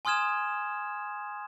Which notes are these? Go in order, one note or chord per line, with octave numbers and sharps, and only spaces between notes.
G#5 C6 D#6 F6 G#6 E7